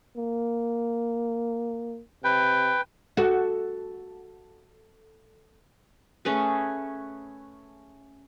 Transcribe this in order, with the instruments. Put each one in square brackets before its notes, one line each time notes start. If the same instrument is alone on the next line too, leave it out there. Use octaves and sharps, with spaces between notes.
[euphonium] A#3
[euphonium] C3 [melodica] B4 G5
[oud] F#4 A4
[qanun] A3 C#4 G#4 B4